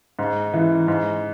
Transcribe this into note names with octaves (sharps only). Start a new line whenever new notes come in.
G#2
E3
G#2